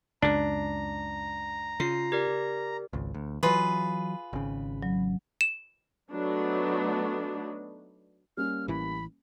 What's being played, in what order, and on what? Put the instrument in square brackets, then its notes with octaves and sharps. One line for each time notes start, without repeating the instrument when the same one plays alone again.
[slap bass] C#2 F#2 C#3 [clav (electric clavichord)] D4 [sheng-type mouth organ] A#5
[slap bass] C#3 [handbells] F4 C7
[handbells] G4 A#4 D5
[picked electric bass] G#1 C#2
D2
[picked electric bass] E3 F#3 [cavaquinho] F4 G#4 B4
[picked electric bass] G#1 C#3
[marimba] F#3
[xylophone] E7
[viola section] F#3 A3 B3 D4 D#4
[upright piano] G3 A#3 C#4 [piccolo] F6
[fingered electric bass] A1 E3 [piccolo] B5